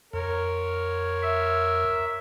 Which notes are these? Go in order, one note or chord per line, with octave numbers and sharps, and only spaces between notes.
F2 A#4 C#5
E5